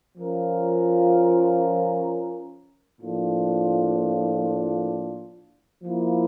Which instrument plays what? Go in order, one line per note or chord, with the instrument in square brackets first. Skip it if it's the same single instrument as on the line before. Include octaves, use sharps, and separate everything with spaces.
[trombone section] F3 C#4 F4 A#4
A2 F3 A#3 D4 F4
F3 A#3 E4